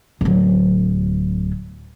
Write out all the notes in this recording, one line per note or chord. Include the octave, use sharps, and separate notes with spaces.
D1 F#3